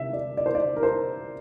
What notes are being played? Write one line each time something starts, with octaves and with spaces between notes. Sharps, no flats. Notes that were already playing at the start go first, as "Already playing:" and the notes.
Already playing: C3 E5
D5
D5
C5
D5
A#4
C5